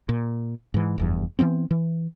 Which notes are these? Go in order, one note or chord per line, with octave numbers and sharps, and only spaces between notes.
A#2
G#2 E3
F1 E2 G2
E3 F#3 B3 C4
E3